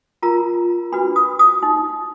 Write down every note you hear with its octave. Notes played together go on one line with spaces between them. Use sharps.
F4 A#4 A#5
D4 F#4 B4 B5
D#6
D#6
D#4